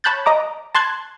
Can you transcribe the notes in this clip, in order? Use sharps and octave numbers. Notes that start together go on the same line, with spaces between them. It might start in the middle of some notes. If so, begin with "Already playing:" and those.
C#5 A5 B5 F#6 G6 A6
D#5 A#5 D6
A5 C6 F#6 G#6